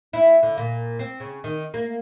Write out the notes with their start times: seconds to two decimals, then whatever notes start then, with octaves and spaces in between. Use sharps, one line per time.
0.13 E4
0.43 D3
0.58 A#2
0.99 C4
1.20 C#3
1.44 D#3
1.74 A#3